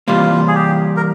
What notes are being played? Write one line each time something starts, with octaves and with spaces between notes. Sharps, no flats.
C3 E3 G3 A#3 F4
G#4
G4
A#4